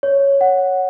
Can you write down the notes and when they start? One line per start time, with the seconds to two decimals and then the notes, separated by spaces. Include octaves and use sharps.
0.03 C#5
0.41 F#5